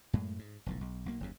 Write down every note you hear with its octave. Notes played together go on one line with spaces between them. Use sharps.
F#2 A2 G#3
G#2
F1 B1 A2
B1
B1 A#3
F#1 D#2 C#3